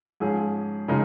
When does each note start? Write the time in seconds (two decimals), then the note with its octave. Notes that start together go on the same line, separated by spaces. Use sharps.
0.20 G#2 F3 C#4 G#4
0.88 C#3 F3 G#3 D#4 A#4